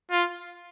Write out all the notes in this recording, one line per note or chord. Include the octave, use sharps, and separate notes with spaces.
F4